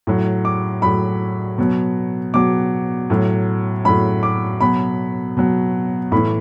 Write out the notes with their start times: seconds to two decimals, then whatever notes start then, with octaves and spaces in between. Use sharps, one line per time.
0.07 A2 F#3
0.45 D6
0.82 A2 F#3 B5
1.58 B2 F#3
2.34 B2 F#3 D6
3.10 A2 F#3
3.85 A2 F#3 B5
4.23 D6
4.61 B2 F#3 B5
5.37 B2 F#3
6.12 A2 E3 B5